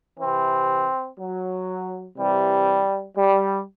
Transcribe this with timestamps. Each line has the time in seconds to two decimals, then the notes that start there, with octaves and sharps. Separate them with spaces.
0.19 C3 E3 C4
1.18 F#3
2.17 C3 E3 G3
3.17 G3